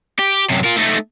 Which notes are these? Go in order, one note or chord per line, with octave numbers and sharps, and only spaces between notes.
G4
F#2 C3
F4 A#4
A3 D#4